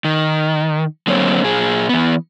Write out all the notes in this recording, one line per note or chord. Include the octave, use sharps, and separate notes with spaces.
D#3
D3 F#3 A#3 C4 C5 C#5
A#2 G#4
E3 B3